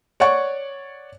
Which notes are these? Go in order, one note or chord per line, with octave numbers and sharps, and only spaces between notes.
C#5 D5 F#5 C#6